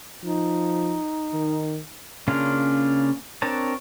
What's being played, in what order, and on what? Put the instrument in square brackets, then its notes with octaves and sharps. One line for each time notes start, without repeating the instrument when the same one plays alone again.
[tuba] F3 [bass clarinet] D#4
[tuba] D#3
[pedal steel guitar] C#3 A#3 C#4 D4 F4
C4 D4 A#4 C#5 A5